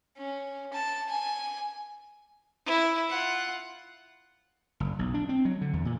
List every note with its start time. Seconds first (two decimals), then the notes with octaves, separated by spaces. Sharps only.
0.17 C#4
0.73 A5
1.09 G#5
2.66 E4
3.09 F4 F#5
4.80 F#1
4.99 B1
5.14 D4
5.29 C4
5.45 F#3
5.61 D3
5.73 E2
5.85 A#2